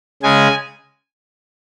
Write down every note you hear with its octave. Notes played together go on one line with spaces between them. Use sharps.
C#3 G#3 G#5